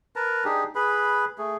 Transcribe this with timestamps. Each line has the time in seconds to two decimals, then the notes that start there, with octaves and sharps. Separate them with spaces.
0.16 A#4 B4 A5 A#5
0.45 D4 D#4 G4 G#4
0.75 G#4 B4 B5
1.38 A3 G#4